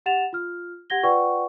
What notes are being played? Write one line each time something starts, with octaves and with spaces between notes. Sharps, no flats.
G4 F#5 A6 E7 F7
F4 F6
G4 F#5 G#6 A#6 G7
F4 B4 D5 F#5 G5 C#6